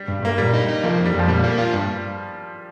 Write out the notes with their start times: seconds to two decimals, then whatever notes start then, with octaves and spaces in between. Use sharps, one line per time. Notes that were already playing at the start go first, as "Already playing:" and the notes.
Already playing: G3
0.08 G2
0.23 G2 A#3
0.38 A#2 G3
0.54 D#4
0.68 D#4
0.83 F3 A#3
0.98 F2
1.05 G3
1.14 F2
1.19 F3
1.28 A#2 G3
1.44 A#3
1.58 F4
1.73 G2